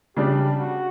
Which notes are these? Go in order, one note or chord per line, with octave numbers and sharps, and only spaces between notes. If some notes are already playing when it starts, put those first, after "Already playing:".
C#3 G3 D4 G4
F#4